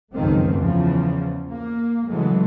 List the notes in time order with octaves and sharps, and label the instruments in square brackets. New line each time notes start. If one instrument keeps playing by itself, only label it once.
[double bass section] C#2 F#2 D#3 F3 A3 C4
E2 C#3 F3
A#3
C#3 E3 F#3 G#3 A3